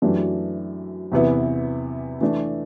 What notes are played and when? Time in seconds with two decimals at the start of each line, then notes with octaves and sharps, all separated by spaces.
0.02 F#2 E3 A3 D4 G4
1.12 E2 C3 E3 B3 E4
2.21 E3 A3 D4